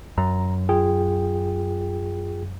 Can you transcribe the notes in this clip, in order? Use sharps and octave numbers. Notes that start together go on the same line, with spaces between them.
F#2 A#5
F4 G#4 G5